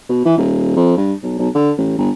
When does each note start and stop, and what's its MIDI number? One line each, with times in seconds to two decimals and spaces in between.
0.09 0.24 47
0.25 0.33 52
0.37 0.74 27
0.76 0.95 41
0.97 1.13 43
1.22 1.35 35
1.38 1.48 35
1.55 1.71 50
1.77 1.94 33
1.98 2.10 31